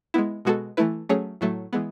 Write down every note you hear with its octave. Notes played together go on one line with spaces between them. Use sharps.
G#3 B3 E4
B2 G#3 B3 F#4 A4
E3 A3 E4 B4
F#3 A3 C#4 G#4 C#5
A2 F#3 A3
E3 G#3 B3